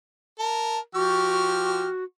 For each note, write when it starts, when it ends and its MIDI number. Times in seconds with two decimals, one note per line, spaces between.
0.39 0.78 70
0.39 0.79 81
0.95 1.87 53
0.95 2.03 66
0.95 1.87 67
0.95 1.69 85
0.95 1.87 89